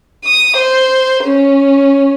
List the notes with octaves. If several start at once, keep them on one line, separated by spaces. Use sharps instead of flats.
D#6
C5
C#4